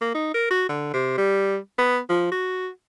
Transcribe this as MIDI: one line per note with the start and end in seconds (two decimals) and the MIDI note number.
0.01 0.11 58
0.15 0.32 63
0.34 0.47 70
0.51 0.66 66
0.69 0.90 50
0.94 1.14 48
1.18 1.57 55
1.78 1.99 59
2.09 2.28 53
2.32 2.69 66